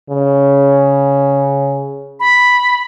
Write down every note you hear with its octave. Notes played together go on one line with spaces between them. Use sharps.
C#3
B5